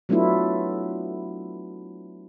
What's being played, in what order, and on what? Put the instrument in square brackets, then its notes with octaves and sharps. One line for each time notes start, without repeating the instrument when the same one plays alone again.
[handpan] F#3 A3 B3 D4 E4 F4